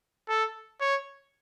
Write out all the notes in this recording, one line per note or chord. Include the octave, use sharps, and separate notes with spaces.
A4
C#5